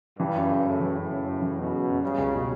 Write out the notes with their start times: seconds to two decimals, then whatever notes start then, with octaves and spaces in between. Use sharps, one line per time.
0.19 G2 E3
0.35 F#2
0.50 C#3
0.65 F#2 A2
0.80 E3
0.96 F#2
1.11 C#3
1.26 F#2
1.42 E3
1.56 F#2 B2
1.72 C#3
1.88 F#2
2.02 C#3 G3
2.18 C#2
2.33 B2